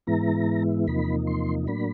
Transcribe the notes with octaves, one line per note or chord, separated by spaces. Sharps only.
G#2 E3 G#3 B3 E4 A#5
E2 C3 F3 A#3 D#4 B5
C6
A2 F#3 A#3 D4 B5